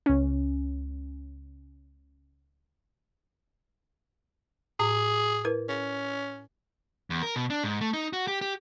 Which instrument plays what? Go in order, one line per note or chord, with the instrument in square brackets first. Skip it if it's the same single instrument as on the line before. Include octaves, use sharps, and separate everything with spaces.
[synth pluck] C#2 C#4
[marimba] A2 [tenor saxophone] G#4
[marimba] E4 A#4 B4
[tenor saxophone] C#4
[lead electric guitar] E2
A#4
B2
D4
G#2
A3
D#4
F#4
G4
G4